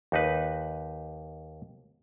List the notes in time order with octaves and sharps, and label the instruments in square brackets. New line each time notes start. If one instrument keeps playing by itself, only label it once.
[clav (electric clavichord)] D#2 D#4 B4